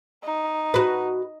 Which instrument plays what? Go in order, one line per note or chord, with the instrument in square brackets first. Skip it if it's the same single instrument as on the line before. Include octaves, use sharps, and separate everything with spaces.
[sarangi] D#4
[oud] F#4 B4